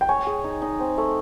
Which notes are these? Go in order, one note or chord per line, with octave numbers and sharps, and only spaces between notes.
G5
C#5 G#5
G#4
D#4
D#4
C4
A3